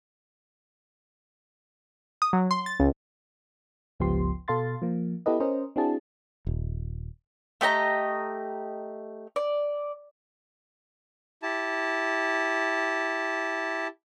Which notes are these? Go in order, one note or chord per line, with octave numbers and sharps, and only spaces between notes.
D#6
F#3
C6
A6
C#2
G1 C#2 F3 B3 G4 C6
B2 A4 F5 C6 A6
F3 A#3
B3 E4 G4 A4 B4 D#5
C#4 A#4 C5 D#5
C4 D4 E4 F#4 G#4 A5
D#1
A3 G4 D#5 A#5
D5
E4 G4 A5